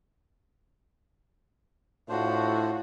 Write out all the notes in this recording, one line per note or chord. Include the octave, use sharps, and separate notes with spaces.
A2 D4 F4 F#4 C5